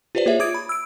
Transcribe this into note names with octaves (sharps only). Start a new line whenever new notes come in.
F4 G4 B4 C5 D5
A#3 F4 G#4 C5 C#5 E5
F4 D6 D#6 G#6 D7
B5
E6 D7